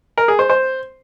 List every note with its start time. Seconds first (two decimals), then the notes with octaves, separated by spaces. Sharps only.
0.18 A#4
0.28 G#4
0.39 C5
0.50 C5